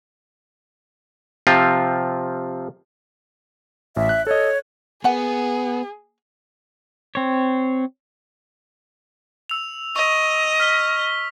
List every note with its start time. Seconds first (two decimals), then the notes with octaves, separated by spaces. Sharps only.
1.47 C3 F3 C4 F4
3.96 A1 E5
4.09 F#6
4.27 A4 C#5 D#5
5.04 A#3 B3 G#4 F#5 G#5
7.15 C4 C#5
9.50 E6 F7
9.96 D#5 C#6
10.60 F6 B6 G7